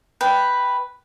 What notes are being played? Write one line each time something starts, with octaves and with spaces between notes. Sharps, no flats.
B4 G5